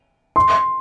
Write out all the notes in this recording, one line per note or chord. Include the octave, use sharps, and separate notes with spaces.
C6